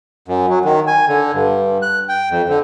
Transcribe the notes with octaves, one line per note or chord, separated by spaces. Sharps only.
F#2
F#3
D#3
G#5
D3
G2
F#6
G5
F2
D3